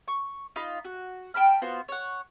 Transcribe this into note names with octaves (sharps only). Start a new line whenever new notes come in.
C#6
D#4 F4 B5
F#4
G5 A5 B5 F6
B3 F4 F#4 C5
C#5 F#5